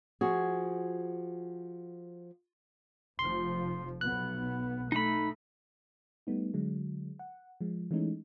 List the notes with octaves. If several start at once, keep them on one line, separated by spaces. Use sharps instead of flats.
F3 F#4 G#4
F1 F3 C6
B1 B3 F#6
A3 D#4 B5
G3 A3 B3 D#4
D3 F#3 G#3
F#5
F3 G#3
E3 G#3 A3 C#4 D#4